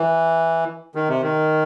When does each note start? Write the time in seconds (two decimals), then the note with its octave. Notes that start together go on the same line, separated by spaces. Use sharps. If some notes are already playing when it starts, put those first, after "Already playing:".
Already playing: E3
0.95 D#3
1.09 C3
1.22 D#3